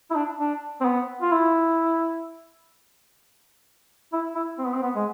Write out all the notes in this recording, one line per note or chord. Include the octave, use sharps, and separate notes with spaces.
E4
D4
D4
C4
B3
F4
E4
E4
E4
C4
B3
C4
B3
G#3